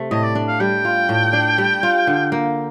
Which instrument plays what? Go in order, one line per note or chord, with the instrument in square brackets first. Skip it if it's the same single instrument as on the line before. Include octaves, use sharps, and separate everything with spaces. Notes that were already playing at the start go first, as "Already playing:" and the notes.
Already playing: [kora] C3 A3
[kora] A2 [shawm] D#5
[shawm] D5
[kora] D4
[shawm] F5
[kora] G3 [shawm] G5
[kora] F4
A2
D4
G3
F4
D3
A#3